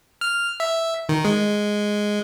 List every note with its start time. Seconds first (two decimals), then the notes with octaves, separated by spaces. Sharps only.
0.21 F6
0.60 E5
1.09 D#3
1.25 G#3